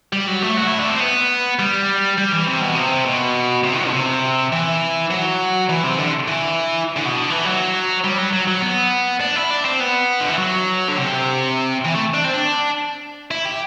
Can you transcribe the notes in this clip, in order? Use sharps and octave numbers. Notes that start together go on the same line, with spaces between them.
G3
F#3
A3
F#4
E4
D4
C4
B3
G3
G3
E3
C3
B2
C3
B2
C3
F#3
B2
C3
E3
F#3
E3
C3
D3
E3
D3
B2
D3
E3
F#3
G3
F#3
F#3
F#3
B3
D4
E4
D4
C4
B3
D3
E3
F#3
D3
C3
E3
A3
D4
C4
D4
E4
G4